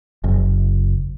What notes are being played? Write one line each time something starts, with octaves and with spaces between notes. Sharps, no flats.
F#1